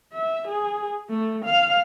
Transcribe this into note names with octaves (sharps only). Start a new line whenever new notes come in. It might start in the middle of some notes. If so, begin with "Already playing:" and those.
E5
G#4
A3
F5